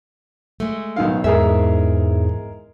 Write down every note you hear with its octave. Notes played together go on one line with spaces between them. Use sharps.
G#3 A3
B1 D#3 F5
E2 G#2 G#3 G#4 A#4 E5